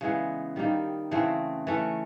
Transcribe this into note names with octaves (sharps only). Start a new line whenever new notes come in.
C#3 E3 G#3 B3
D#3 G3 A#3 D#4
C#3 E3 A3 C4
E3 A3 C#4